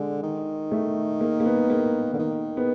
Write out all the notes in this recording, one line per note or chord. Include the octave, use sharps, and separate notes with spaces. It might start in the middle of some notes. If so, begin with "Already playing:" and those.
Already playing: D3 G#3
D#3
A3
A#3
A#3
B3
A#3
D3
D#3
B3